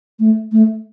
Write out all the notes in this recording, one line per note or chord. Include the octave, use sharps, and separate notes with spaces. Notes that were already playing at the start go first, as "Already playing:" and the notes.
A3
A3